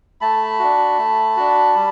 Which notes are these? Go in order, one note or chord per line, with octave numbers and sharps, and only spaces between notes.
A3 A5 B5
D4 F#4
A3
D4 F#4
G3